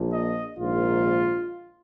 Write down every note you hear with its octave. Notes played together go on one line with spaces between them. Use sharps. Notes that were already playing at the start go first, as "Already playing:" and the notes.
Already playing: A#1 A#2 F3
D#5
A#1 G#2 D#3 F4